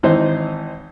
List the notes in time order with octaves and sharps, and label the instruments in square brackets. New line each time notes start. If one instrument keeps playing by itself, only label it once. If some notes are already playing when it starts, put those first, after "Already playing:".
[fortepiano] G#1 E3 D#4 C5